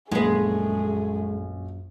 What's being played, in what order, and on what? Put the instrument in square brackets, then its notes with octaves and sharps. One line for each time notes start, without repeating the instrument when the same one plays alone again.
[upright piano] A#1 [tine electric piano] F#2 [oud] G#3 B4 [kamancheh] A3 G#4